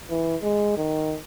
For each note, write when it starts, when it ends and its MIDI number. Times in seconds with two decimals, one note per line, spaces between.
0.11 0.36 52
0.42 0.76 56
0.78 1.16 51